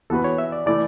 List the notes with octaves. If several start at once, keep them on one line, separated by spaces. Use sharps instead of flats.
E3 B3 F#4 A4 B4
C#5
E5
D5
E3 A3 E4 D5